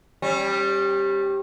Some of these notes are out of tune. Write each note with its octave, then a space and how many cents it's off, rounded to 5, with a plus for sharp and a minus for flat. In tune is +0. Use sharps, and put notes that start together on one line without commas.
G3 +0 C#4 -40